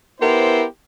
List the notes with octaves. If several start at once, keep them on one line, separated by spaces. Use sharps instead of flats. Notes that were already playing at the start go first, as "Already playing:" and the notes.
B3 E4 G4 A#4 C5